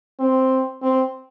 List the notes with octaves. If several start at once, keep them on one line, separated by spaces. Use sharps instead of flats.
C4
C4